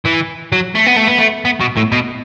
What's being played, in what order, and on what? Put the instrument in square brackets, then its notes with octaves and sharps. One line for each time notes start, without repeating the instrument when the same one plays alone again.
[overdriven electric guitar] E3
F#3
A3
B3
A3
B3
A3
B3
B2
A2
B2